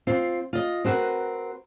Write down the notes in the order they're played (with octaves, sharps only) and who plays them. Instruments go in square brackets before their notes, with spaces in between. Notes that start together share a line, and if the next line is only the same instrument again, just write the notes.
[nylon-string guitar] C4 F4
F4 D#5
C4 F#4 G#4 A#4 B4